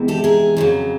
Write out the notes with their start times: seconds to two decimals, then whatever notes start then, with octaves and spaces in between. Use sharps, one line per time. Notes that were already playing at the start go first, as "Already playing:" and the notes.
Already playing: E2 C3 E3 G#3 C4
0.08 G4 A4
0.24 G#4 A#4
0.57 F2 C#3 F#3